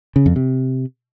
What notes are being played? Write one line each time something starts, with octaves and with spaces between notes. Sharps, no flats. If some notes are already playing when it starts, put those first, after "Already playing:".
C#3
F2
C3